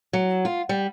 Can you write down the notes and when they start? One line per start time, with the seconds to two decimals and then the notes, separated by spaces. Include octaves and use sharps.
0.13 F#3
0.45 F4
0.69 G3